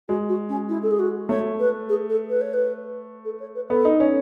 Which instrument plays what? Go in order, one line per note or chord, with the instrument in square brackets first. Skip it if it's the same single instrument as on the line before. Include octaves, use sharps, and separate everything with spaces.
[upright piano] G#3 [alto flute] F#4
[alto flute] F#4
C#4
E4
A4
G#4
F#4
[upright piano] A3 [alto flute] C#5
[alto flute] B4
G#4
A4
B4
C#5
B4
A4
C#5
B4
[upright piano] B3 [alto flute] A4
[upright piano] D#4
C#4